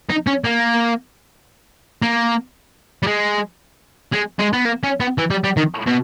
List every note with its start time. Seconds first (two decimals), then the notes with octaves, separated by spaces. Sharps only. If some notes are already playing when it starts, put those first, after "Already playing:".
0.10 D#4
0.27 C#4
0.44 A#3
2.02 A#3
3.03 G3
3.07 G#3
4.13 G#3
4.39 G#3
4.53 B3
4.65 A#3
4.83 C#4
5.00 B3
5.18 E3
5.30 G3
5.44 G3
5.57 D#3
5.87 B2